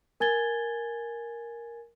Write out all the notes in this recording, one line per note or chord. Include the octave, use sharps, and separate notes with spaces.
A#4 G#5 G#6 A6 G7